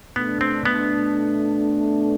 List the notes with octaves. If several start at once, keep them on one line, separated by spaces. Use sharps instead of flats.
B2 A3 B3 D4
C4
B3